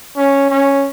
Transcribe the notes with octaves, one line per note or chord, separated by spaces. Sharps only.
C#4
C#4